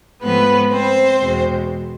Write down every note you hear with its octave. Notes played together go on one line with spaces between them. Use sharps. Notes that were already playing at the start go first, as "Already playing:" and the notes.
G#2 F3 A3 B3 C4 B4
C4 C5
E2 B2 G#3